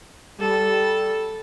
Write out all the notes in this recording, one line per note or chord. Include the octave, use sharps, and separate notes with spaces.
G3 A4